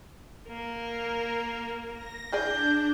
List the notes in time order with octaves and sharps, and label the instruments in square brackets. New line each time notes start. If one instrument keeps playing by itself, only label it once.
[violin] A#3 A#4
[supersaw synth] A#6
[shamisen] E3 G#4 D5 [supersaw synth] D4 [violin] G6